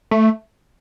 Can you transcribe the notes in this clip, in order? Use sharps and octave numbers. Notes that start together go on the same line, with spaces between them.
A3